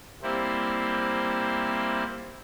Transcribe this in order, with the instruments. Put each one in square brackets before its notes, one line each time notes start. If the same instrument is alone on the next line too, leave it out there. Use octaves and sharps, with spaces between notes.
[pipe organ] G3 A#3 C4 E4